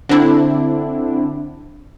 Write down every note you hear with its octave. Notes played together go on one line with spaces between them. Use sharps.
D3 C4 D4 E4